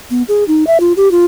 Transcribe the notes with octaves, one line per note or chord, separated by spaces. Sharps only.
B3
G#4
D#4
E5
F4
G4
F4